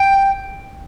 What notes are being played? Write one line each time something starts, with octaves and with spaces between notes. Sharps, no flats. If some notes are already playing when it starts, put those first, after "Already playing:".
Already playing: G5